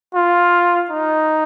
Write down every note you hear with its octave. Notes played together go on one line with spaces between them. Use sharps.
F4
D#4